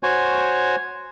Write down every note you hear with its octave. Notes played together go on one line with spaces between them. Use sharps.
F#4 C5 C#5 G#5